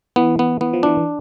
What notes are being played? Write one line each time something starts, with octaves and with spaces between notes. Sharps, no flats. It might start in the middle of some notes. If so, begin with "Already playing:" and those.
E3 B3
B3
E3 B3
F3
E3 D4